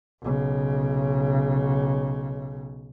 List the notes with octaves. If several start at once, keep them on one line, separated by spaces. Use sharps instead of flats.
B1 C#3